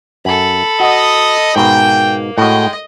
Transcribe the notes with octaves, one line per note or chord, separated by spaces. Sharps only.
F#2 A4 B5
F#4 D#5
G#2 B2 A#3 G5
A2 G#3 F#4 D#5 G5